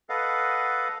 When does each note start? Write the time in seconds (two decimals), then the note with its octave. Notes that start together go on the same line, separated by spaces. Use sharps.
0.09 A4 B4 D#5 F5 F#5